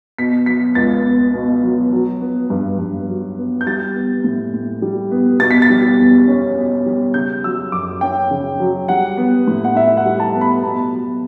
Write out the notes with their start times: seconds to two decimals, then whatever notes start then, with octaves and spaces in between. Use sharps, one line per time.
0.18 B2 B6
0.46 F#3 B6
0.75 C#2 A6
1.04 B3
1.34 B2
1.63 F#3
1.93 F#3
2.21 B3
2.50 G2
2.79 G2
3.08 F#3
3.38 B3
3.61 G6
3.66 G3 A6
3.95 B3
4.24 A2
4.54 A2
4.82 G3
5.11 B3
5.40 B2 A6
5.51 B6
5.62 A6
5.70 G3
5.99 E2
6.27 C#4
6.57 B2
6.86 G3
7.14 C#3 G6
7.44 F#3 E6
7.72 F#2 D6
8.01 C#4 G5
8.31 C#3
8.60 F#3
8.88 G3 F#5
9.17 B3
9.48 A2
9.64 F#5
9.76 A2 E5
9.97 F#5
10.06 G3
10.20 A5
10.35 B3
10.41 B5
10.64 B2 A5
10.93 F#3